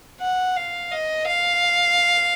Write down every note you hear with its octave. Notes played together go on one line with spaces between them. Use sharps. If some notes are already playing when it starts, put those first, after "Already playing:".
F#5
F5
D#5
F5